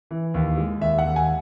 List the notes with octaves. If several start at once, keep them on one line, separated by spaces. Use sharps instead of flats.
E3
D#2
G#3
D#2 E5
F#5
D#2
G#5